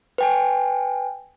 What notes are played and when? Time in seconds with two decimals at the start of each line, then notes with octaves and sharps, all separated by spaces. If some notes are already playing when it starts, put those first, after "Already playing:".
0.18 B4 G5 G#5